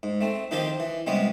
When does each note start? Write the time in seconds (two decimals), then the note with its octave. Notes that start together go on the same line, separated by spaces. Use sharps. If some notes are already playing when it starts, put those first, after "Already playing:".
0.03 G#2
0.21 A3 C4
0.51 D#3 F3 C4 D#4 F4 G4
0.80 E3
1.07 C3 G3 G#3 B3 C#4